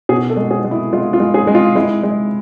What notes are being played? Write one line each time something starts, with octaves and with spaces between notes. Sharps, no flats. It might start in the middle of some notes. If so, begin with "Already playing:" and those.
B2 G#4
A4
G#3
G#4
G#3
E4
G#3 F4
F4
G#3
G#4
G#3
F4
G#3 E4
G#3